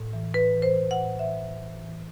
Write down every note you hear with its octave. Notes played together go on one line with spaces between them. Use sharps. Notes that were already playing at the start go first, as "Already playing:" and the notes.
Already playing: A2
E3
A2 B4
E3
C5
E3
F#5
A2
E3 E5
A2
E3
E3